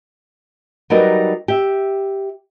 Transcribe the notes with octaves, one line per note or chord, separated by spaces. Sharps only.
F#3 G3 D#4 A#4 B4
G4 E5